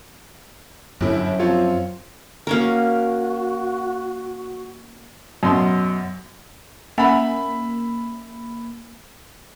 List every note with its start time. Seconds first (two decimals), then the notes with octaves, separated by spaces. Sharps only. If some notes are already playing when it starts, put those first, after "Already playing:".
1.01 G1 F#2 E4
1.39 F3 C4 F4 C#5
2.47 A#3 C#4 F#4 A#4
5.43 F#2 B2 C6
6.98 A#3 C#4 E5 F#5 G#5 B5